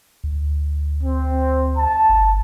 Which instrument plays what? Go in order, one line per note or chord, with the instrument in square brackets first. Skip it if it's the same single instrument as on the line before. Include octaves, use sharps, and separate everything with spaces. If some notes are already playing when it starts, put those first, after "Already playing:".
[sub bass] D2
[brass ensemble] C4
A5
[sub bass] G1